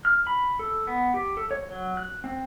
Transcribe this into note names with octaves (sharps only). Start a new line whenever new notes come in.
F6
B5
A4
B3
G4
A4
C#5
F#3
F#6
C4